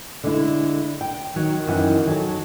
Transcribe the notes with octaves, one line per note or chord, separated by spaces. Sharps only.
D3 G#3 E4
G5
D#3 F#3
F#2 E3 F#5
F#3 A4 A5